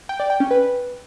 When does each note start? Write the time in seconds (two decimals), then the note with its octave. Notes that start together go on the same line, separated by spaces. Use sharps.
0.09 G5
0.20 D5
0.30 G5
0.40 C#4
0.51 B4